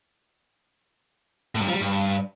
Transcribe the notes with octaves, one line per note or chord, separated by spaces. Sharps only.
A2
G2
F3
G3
G2